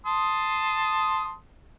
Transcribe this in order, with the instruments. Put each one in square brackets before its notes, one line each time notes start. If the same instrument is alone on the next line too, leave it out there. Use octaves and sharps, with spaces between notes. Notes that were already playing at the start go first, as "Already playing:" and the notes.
[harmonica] A5 C6 D#6